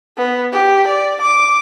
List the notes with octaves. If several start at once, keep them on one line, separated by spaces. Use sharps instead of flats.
B3
G4
D5
D6